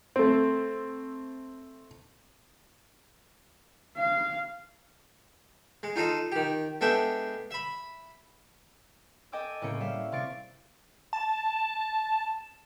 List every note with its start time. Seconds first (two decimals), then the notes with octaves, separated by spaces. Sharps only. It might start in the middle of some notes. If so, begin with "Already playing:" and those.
0.16 A3 C4
3.97 F5
5.83 G#3
5.96 D#4 F4 A4 D#5
6.32 D#3 G4
6.81 G#3 B3 D4 A4 E5 G5
7.51 E5 B5
9.32 A4 D#5 G5 G#5 D6 E6
9.61 A2 C#3 A#3 C#4 G5 C#7
9.80 G3 E5 F5
10.12 C3 F5 C#6 A6 D7
11.13 A5